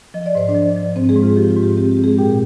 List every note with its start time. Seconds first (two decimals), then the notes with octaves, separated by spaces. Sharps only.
0.14 F3 D#5
0.26 D5
0.35 G#2 C5
0.49 D4 D5
0.55 F3
0.76 F3
0.96 G#2 C4 C5
1.09 G#3 G#4
1.16 G#2
1.23 F4
1.36 F3 G4
1.51 F4
1.57 G#2
1.63 G4
1.77 C4 G4
1.91 G4
1.97 C4
2.04 G#3 G#4
2.18 A#2 G4 G5